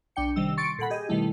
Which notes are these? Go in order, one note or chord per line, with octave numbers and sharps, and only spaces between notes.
B1 D4 G5 C#7
C3 D#3 G3 E6
C6 C#6 A6 C#7 D7
A#2 A4 F#5 B5
G4 G#4 D#5
B2 D#3 G3 A3 E4